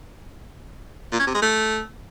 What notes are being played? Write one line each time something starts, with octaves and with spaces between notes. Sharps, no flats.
A#2
C#4
C3
G#3
A3